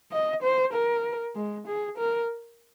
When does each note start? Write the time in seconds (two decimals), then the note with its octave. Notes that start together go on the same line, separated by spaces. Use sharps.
0.12 D#5
0.43 C5
0.73 A#4
1.35 G#3
1.67 G#4
1.98 A#4